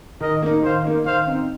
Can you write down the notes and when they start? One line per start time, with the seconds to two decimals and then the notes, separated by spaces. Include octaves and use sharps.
0.21 D#3 A#4 D#5
0.42 A#3 D#4
0.62 D#3 C5 F5
0.84 A#3 D#4
1.05 D#3 C5 F5
1.27 C4 D#4